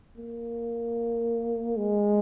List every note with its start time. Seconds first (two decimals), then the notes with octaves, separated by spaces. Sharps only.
0.17 A#3
1.77 G#3